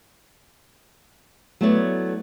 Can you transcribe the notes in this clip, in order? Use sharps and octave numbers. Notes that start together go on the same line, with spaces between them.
F#3 A3 B3 E4 C#5 D5